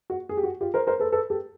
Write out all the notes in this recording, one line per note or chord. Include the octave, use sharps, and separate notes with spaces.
F#4
G#4
G4
F#4
F4 G4
A#4 C5
A#4 C5
A4 B4
A4 B4
G4 A4